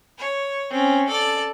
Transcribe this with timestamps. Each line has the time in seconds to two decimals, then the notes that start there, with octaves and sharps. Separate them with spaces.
0.18 C#5
0.70 C4 C#4
1.08 A4 D5